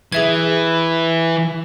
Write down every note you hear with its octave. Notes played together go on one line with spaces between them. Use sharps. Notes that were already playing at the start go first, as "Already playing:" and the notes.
E3 G#4 E5 G#6